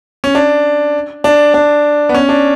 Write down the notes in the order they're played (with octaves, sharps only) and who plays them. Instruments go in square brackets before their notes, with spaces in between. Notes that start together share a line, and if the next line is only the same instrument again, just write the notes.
[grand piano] C#4
D4
D4
D4
B3
C#4
D4